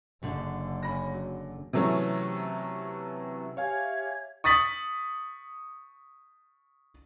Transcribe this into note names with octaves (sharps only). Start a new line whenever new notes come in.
F#1 F#2 D3
C#4 B5 A#6
F#3
C3 E3 F#3 A3 C#4
G4 C#5 E5 F5 G#5 G#6
C#6 D#6 A6 B6 F#7